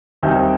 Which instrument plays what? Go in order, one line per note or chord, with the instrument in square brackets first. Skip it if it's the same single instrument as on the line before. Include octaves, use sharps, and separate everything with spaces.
[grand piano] D#2 D#3 G3 C4 D#4 E5 G5